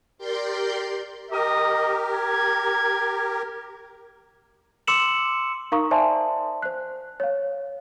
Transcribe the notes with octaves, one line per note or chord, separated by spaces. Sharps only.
G4 A#4 D5 C6 G6
G4 A#4 D#5
G#6
C6 D6 E6 C#7 E7 F#7
D#4 A#4 F5 A#5 C#6 D#6
C5 D5 E5 G#5 A5 C6
C5 F#6
C#5 F5